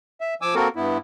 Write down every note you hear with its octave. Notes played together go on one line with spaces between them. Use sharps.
E5
F3 G#5 D6 E6
A#3 C4 F#4 A4 A#4
G2 B3 E4